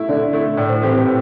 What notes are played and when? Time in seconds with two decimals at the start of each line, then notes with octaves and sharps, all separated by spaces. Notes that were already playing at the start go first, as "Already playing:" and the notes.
Already playing: A3 E4
0.09 D3 A4 D5
0.33 A3 E4
0.57 A2 D5
0.69 C5
0.81 E3 C4 G4 A4
0.93 C5
1.05 A2